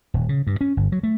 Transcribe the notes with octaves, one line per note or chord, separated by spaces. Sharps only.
D#1
C#3
G2
C#4
G1
F#3
A3